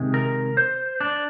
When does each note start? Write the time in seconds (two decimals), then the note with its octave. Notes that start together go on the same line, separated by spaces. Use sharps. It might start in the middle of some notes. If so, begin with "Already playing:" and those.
Already playing: C3 D#3 G#3
0.14 A#4
0.57 C5
1.00 D4